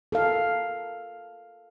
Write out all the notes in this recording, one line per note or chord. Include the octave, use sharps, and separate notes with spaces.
A4 A#4 F5